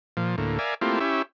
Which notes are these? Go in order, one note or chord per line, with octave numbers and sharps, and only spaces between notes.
A#2 F3
D2 A2 A#3
A#4 D5 E5 F5 G#5
A3 A#3 C4 E4 F4 G4
C#4 E4 G4 E5